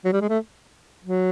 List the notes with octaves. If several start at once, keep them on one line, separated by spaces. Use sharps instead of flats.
F#3
G3
G#3
A3
F#3